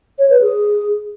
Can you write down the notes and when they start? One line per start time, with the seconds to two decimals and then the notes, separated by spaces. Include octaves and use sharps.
0.19 C#5
0.30 B4
0.42 G#4